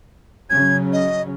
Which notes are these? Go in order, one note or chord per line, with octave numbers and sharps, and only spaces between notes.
C#3 F#3 C#4 G#6
D#5